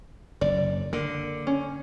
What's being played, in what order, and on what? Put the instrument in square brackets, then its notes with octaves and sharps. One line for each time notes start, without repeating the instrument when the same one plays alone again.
[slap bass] F#1 [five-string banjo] D5
[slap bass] D3 [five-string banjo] A#3
[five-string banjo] C#4